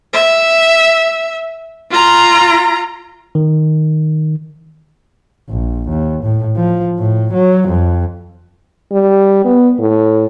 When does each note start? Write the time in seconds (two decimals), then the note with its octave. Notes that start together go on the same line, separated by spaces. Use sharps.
0.13 E5
1.91 F4 A#5
3.35 D#3
5.49 A#1
5.89 D#2
6.23 A2
6.56 F3
6.98 A2
7.33 F#3
7.68 F2
8.92 G3
9.45 B3
9.79 A2